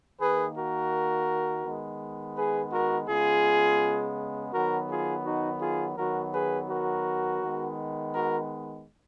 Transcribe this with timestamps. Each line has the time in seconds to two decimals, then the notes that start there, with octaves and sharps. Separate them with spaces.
0.20 D#3 A#3 G#4 B4
0.56 F#4 A#4
1.65 D#3 G#3 B3
2.37 G#4 B4
2.72 F#4 A#4
3.09 C#3 G#3 B3 F4 G#4
4.53 D#3 F#3 B3 F#4 A#4
4.89 F4 G#4
5.25 D#4 F#4
5.61 F4 G#4
5.97 D#3 F#3 B3 F#4 A#4
6.34 G#4 B4
6.69 F#4 A#4
7.41 D#3 G#3 B3
8.13 F#4 A#4